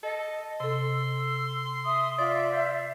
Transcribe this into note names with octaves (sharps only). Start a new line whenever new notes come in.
A4 D#5
C3 A4 C6 E6
E5 D#6
F4 D5 E5
C5